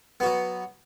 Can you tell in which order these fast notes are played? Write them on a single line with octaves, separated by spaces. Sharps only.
B3 F#4 F#3